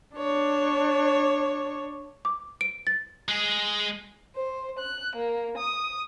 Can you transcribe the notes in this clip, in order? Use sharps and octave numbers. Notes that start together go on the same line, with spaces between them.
D4 C#5
D6
D7
A6
G#3 G#4
C5
F#6
A#3
D#6